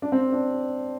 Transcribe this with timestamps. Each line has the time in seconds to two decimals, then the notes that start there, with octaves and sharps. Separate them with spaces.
0.02 D4
0.12 C4
0.32 D4